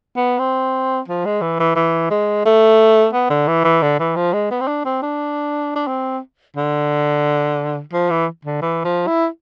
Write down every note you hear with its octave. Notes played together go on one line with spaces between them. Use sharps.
B3
C4
F3
G#3
E3
E3
E3
G#3
A3
B3
D3
E3
E3
D3
E3
F3
G#3
B3
C4
D4
C4
D4
D4
C4
D3
F3
E3
D3
E3
F3
E4